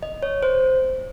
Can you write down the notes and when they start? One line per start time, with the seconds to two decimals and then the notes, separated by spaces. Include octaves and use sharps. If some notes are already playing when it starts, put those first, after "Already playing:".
0.03 D#5
0.23 C#5
0.43 C5